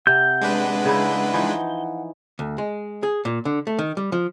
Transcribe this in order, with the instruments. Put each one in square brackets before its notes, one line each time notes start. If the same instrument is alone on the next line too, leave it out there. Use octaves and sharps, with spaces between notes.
[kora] C3 [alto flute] F#5 [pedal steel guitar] G6
[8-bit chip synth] G#3 D4 B4
[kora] C#3 D#4 E4
E3 F3 D#4
[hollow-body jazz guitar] D2
G#3
G#4
A#2
D3
A3
D#3
G3
F3